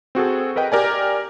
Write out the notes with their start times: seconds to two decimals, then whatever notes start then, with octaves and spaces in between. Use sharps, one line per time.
0.15 C4 F#4 G#4 A4
0.56 A#4 B4 D#5 G5
0.72 G4 A#4 D5 G#5